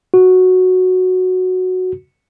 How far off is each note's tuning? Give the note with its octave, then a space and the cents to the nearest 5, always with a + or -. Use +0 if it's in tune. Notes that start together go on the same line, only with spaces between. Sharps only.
F#4 -5